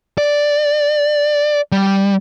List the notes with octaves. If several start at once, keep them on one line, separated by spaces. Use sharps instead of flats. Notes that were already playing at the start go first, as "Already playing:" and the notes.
D5
G3